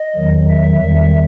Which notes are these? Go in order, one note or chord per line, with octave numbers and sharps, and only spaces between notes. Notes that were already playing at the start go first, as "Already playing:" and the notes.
Already playing: D#5
E2 D#3 F#3
E5
E2 D#3 G3